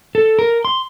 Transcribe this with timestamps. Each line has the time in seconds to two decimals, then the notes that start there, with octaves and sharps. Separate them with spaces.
0.15 A4
0.39 A#4
0.65 C6